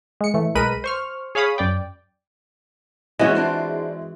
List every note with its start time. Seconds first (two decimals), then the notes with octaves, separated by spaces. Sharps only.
0.21 G#3 C#7
0.34 A2 E3 A3
0.55 B1 G#3 A#4 B4 B5 D#7
0.84 C5 C#6 F6
1.35 G#4 C#5 F5 B5 D#6
1.58 F#2 D5 G5
3.19 E3 G#3 C4 C#4 E4 F#4 C#5 D#5
3.35 D4 F4 C5